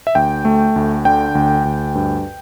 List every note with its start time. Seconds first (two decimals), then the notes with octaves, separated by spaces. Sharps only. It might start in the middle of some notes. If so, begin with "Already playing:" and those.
0.07 E5
0.15 D2 G5
0.45 A3
0.76 D2
1.05 D3 G5
1.35 D2
1.65 D2
1.95 G2